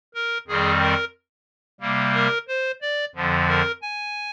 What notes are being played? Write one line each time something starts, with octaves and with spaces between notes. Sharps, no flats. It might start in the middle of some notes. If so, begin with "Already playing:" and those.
A#4
F2 D#3 G3 C4 G#4
A#4
C3 G3 A#3
A#4
C5
D5
F2 D3 F3
A#4
G#5